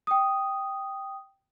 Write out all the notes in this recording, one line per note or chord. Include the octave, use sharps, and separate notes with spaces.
G5 D#6